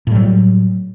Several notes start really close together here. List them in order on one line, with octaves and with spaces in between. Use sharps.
A2 G3 F#3